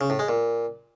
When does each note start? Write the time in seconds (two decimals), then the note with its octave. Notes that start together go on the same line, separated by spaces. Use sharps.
0.01 C#3
0.10 A2
0.19 G#3
0.29 A#2